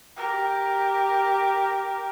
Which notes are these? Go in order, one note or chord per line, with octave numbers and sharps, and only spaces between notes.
G4 A#4